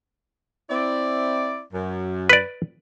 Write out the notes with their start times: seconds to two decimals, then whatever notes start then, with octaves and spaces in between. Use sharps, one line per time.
0.70 C4 E4 D5
1.73 F#2
2.29 B4 D5